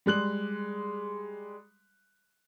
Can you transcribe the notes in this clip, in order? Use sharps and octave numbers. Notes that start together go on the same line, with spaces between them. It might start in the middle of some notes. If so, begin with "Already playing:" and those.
G3 G#3 F#6 F#7